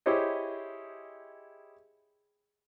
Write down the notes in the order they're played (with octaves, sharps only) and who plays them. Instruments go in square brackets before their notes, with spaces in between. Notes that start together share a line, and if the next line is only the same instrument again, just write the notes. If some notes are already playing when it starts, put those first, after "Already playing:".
[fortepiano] E4 G4 G#4 C5 C#5 D#5